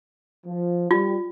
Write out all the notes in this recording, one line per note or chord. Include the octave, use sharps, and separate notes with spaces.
F3
G3 F4